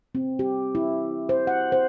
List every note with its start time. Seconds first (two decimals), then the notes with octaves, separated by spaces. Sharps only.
0.15 C4
0.39 G4
0.75 E4
1.29 C5
1.47 F#5
1.72 C5